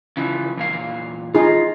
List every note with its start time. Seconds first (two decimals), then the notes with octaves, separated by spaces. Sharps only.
0.17 C#3 E3 F3
0.57 E2 A#2 F5
1.35 D#4 F4 G#4